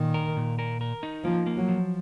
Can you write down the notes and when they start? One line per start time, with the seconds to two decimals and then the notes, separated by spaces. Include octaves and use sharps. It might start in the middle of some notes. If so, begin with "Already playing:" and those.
Already playing: A#2 D#3
0.14 A#4
0.37 A#2
0.59 A#4
0.81 A#4
1.03 D#4
1.24 F3 A#3
1.47 A#3
1.57 F#3
1.68 F3